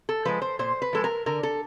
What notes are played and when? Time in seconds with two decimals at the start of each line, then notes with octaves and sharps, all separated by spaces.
0.09 A4
0.25 F3 G#3 B4
0.42 C5
0.59 A#2 C5
0.82 B4
0.93 F3 G#3 A4
1.04 A#4
1.26 D3 A#4
1.43 A4